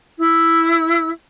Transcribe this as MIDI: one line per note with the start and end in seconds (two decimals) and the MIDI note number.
0.20 1.10 64
0.20 1.10 88